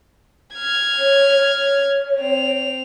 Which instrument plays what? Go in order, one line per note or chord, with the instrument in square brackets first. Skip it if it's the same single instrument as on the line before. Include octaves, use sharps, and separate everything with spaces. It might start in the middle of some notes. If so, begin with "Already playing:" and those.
[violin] F6 G#6
[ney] C#5
C#5
[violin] C4 F7